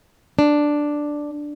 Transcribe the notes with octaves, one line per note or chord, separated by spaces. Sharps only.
D4